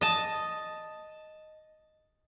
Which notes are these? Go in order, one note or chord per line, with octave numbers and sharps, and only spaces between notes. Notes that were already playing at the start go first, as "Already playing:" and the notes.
D#5 A5